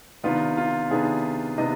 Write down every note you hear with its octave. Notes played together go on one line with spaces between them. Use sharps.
C3 D#3 B3 D4 F4
F4
C3 D#3 B3 D4 G#4
C3 D#3 B3 D4 D#5